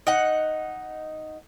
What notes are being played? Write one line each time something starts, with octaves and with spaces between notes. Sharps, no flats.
D#4 F#5